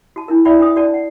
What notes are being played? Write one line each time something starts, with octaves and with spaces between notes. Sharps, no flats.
F#4 A5
D4 E4 A#4
E4 D5 E5 G5 B5
D4 B4 G5 D#6
F#4 B4 D5 G5 A5
F#5